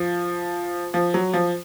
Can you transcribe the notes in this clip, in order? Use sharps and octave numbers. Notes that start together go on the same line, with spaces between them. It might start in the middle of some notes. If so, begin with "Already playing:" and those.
Already playing: F3 F4
F3
F#3
F3